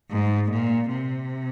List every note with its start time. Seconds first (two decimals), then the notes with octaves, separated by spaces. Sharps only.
0.10 G#2
0.50 A#2
0.90 C3